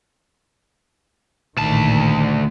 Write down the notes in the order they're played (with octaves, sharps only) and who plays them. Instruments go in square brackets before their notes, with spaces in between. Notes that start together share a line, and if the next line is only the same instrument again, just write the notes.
[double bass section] A1 A#2 D#3 [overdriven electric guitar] D2 A5